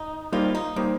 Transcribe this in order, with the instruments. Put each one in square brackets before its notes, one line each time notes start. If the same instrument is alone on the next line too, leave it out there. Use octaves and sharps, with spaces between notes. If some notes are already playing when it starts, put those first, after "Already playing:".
Already playing: [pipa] D#4
[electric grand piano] G3 A#3 D#4 C5 [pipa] F4
[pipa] D#4
[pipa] D#3 [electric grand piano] G3 A#3 D#4 C5